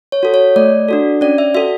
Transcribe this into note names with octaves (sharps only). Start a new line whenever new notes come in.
C#5
F#4 A4
C#5
A3 D5
D4 F#4 A4
C#4 D5
E5
F#4 A4 E5